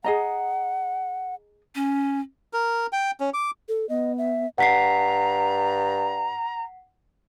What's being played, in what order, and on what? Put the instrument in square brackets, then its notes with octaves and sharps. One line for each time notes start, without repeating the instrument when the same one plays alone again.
[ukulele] G#4 D#5 A#5 [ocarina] F#5
[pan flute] C#4
[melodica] A#4
G5
C#4
D6
[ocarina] A4
[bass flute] B3 [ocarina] D#5
[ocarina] E5
[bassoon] G2 [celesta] F#5 B6 C7 [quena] A#5